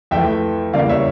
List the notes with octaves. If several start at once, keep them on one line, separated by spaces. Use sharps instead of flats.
F2 E3 A3 E5 G5
E2 C#3 E3 G3 A#3 D5 F5
C#5 E5